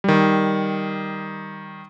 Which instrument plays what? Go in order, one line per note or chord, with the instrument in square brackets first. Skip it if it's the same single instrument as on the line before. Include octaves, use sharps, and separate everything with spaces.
[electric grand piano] D#3 G3